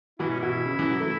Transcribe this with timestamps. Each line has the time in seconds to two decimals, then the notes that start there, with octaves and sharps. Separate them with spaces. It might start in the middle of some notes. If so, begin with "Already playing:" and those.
0.19 B2 E3 E4
0.30 C#4
0.40 B2 E4
0.65 C#3
0.79 E3
0.90 F#3
1.00 A3